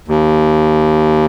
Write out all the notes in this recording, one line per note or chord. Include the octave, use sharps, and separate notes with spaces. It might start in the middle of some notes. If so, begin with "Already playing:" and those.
D#2